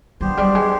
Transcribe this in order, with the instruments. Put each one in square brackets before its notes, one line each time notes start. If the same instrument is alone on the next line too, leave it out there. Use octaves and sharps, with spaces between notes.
[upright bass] F#3 [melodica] B3 D4 G4 C5
[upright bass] G3
G#3